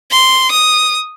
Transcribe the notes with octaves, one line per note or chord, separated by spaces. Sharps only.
C6
D#6